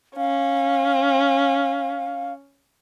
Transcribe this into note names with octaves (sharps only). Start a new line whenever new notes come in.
C#4 F5